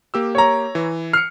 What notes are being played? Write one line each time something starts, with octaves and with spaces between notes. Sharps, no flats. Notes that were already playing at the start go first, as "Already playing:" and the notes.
A#3 G4 E6
C#5 A#5
E3
F6 C7 C#7